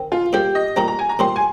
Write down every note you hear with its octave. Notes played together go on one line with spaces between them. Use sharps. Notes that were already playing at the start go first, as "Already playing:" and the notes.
Already playing: D#3 C4
F4
A#2 G3 C4 G4
D#5
A#2 G3 C4 A#5
A#5
G#5
A#5
A#2 G3 C4 C6
G#5